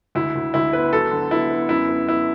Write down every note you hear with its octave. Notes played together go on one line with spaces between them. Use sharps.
D2 E4
D2
D2 E4
B3 B4
F#3 A4
D3
B3 E4
B3
F#2 E4
B3
B3 E4